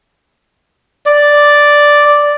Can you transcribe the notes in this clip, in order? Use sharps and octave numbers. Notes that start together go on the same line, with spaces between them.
D5